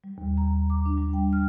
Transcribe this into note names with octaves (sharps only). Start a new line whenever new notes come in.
G3
D#2
A#5
D6
D4
G3
G5
F6